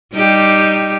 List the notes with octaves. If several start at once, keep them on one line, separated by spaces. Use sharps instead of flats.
G3 D#4 G4